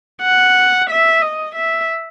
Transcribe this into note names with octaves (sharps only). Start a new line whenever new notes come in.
F#5
E5
D#5
E5